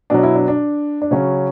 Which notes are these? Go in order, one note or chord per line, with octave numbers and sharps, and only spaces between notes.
B2 F#3 D4
E4
D4
D4
D4
C#3 F#3 C#4